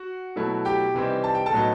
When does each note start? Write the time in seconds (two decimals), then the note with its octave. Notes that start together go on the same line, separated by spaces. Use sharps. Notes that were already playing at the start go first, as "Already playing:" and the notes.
Already playing: F#4 F#5
0.36 B2 F#3 A3 E4
0.65 G4 G5
0.94 C3 E3 G3 C4 D#4
1.24 A5
1.35 G5
1.46 A4 A5
1.53 A2 F#3 B3 D#4